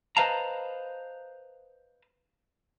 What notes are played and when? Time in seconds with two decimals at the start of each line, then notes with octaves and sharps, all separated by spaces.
0.17 B4 C5 D#5 F5 A5 A#5